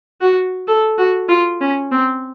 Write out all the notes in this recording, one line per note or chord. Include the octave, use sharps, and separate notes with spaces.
F#4
A4
F#4
F4
C#4
C4